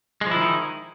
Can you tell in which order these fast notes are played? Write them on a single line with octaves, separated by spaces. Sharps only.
G#3 F3 E4 D#3 D#4